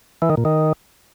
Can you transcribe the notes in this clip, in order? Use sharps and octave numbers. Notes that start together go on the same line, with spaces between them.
E3
D#3
A#2
D#3